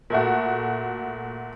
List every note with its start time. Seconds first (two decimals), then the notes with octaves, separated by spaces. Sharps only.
0.10 A#2 A3 F#4